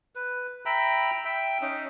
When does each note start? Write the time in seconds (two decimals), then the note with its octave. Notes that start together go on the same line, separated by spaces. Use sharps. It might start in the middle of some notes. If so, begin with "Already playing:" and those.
0.15 B4
0.66 E5 G5 A#5 B5
1.25 E5 G5
1.61 C#4 D#4